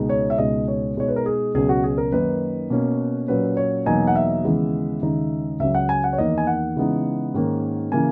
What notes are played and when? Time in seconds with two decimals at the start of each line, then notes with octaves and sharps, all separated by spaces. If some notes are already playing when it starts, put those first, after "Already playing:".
Already playing: C#2 B2 G#3 D#4
0.09 C#5
0.30 E5
0.38 C#2 B2 G#3 D#4 D#5
0.68 C#5
0.96 B2 G#3 D#4 C#5
1.08 B4
1.16 A#4
1.26 G#4
1.55 C#2 B2 F#3 C#4 G#4
1.69 F#4
1.84 G#4
1.98 A#4
2.12 F#2 D#3 A#3 D#4 B4
2.70 B2 A#3 C#4
3.28 A#2 F#3 C#4 B4
3.57 C#5
3.86 E2 B2 F#3 A#3 D#4 G#5
4.07 F#5
4.15 E5
4.44 D#2 C#3 E3 G#3 B3
5.03 D#2 C#3 G#3 D#4
5.60 C#2 C#3 F#3 C#4 E5
5.75 F#5
5.89 G#5
6.04 F#5
6.13 C#5
6.18 E2 D#3 A#3 D#5
6.38 G#5
6.47 F#5
6.76 C#3 E3 G#3 B3 D#4
7.34 G#2 D#3 A#3 C#4
7.92 C#3 E3 A#3 G#5